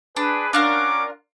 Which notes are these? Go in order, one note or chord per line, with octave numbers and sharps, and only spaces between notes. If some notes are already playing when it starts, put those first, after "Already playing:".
D4 G#4 B4
C#4 D4 F4 A#4 F#5 D6